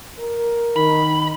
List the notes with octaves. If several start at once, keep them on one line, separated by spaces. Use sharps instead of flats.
A#4
D#3 B5